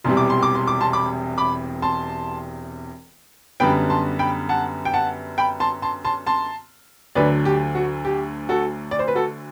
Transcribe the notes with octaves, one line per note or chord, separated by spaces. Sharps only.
E1 E2 C3 G3 C6
D6
C6
D6
C6
D6
A5 C6
B5 D6
B5 D6
A5 C6
F#2 D3 G3 B3 G5 B5
A5 C6
G5 B5
F#5 A5
G5
F#5 A5
G5 B5
A5 C6
A5 C6
A5 C6
A5 C6
D2 D3 F#3 B4 D5
G4
F#4
G4
F#4 A4
D5
C5
B4
F#4 A4